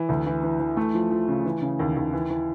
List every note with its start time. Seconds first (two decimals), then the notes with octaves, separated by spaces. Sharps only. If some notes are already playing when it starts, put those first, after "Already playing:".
Already playing: E3
0.09 D2
0.26 E3
0.43 E3
0.60 E3
0.77 A3
0.94 F3
1.11 F3
1.28 C#3
1.45 E3
1.62 C#3
1.79 D#2
1.96 D#2
2.13 E3
2.30 E3